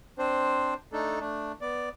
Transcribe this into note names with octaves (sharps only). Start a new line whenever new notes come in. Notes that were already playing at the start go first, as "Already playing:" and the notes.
C4 D4 C5
A3 D4 D#4 A4
A3 D4
B3 D5